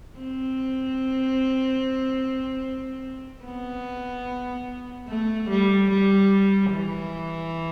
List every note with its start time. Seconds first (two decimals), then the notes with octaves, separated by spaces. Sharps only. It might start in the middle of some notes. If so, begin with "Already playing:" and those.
0.19 C4
3.45 B3
5.09 A3
5.50 G3
5.90 G3
6.72 E3